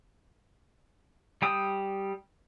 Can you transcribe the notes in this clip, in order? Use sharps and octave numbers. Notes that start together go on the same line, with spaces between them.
G3 G5 D#6 E6